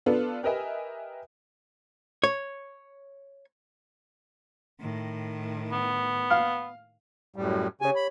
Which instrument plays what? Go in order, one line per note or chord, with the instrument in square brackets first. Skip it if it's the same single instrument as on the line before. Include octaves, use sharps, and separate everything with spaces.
[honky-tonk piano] B3 D4 F4 A4 B4
G4 A#4 B4 D#5 E5 G#5
[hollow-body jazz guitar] C#5
[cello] A2 D#3
[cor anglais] B3
[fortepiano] F5
[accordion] F#2 A2 G3
[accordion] C#3 G#5 [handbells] G4 C#5
[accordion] B5